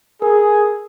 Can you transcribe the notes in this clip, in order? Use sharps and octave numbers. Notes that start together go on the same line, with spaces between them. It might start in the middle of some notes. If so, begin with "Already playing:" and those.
G#4 A#4